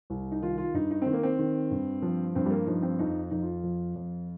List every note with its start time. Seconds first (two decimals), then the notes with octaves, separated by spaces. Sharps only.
0.10 C2
0.32 D#4
0.42 D#3 F4
0.58 F4
0.74 G2 D#4
0.91 D#4
1.02 D#3 C4
1.13 A#3
1.23 C4
1.39 D#3
1.71 G2
2.02 F3
2.35 G2 C4
2.46 G3
2.50 A#3
2.67 F3 D#4
2.82 C4
2.99 F2 D#4
3.31 F2 D#4
3.42 F4
3.63 F3
3.95 F2